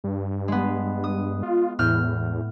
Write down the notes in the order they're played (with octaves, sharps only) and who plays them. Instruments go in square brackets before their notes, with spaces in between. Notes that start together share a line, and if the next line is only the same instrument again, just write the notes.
[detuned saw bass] G2
[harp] G#3 B3
D#6
[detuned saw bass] F4
[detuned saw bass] E2 [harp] A2 F6 G6